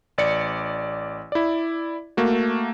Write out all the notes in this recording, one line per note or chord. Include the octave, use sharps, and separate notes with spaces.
A1 D5 C#7
E4 D5
A3 A#3 F#4